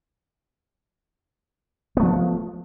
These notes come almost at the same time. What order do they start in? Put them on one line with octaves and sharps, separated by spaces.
B3 A3 F3